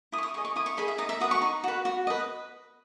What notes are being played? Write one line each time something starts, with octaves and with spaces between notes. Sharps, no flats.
E4 D#6
C#6
D#6
G#4 D#5 C#6
C#6
E4 D#6
C#6
G#4 D#5 B5
E5
D#4 D#5
E5
F#4 B4 D#6
C#6
D#4
F#4 B4
F#4
B4 D#5